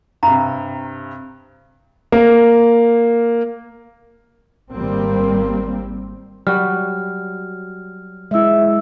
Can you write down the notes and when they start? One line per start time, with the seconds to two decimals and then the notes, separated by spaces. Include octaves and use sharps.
0.23 G2 C3 A#5
2.12 A#3
4.73 G#1 G3 A#3 C4
6.47 F#3 G3 F#4 F6
8.31 G#3 E4 E5 E6